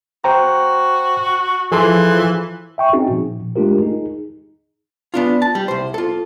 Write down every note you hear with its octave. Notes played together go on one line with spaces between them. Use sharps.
F#4 C5 G5 A#5
E3 F3 G#4 A4 C6
E5 G5 C#6
C4 C#4 D#4 F#4 G#4
A#2 F3
G#3 A3 D4 F4 G4 A#4
D#4 G#4
B3 D4 F4
A5
G3
C2 C5
F4 A4